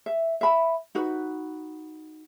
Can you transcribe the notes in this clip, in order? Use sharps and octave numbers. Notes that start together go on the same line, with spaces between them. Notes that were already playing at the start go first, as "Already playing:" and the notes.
E5
E5 B5
D#4 F#4 B4